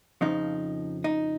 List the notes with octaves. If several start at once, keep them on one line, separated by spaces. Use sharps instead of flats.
F2 C#3 F3 D#4
D#4